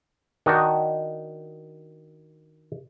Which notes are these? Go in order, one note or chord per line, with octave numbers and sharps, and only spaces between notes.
D#3 D4 D#4 F#4 D#5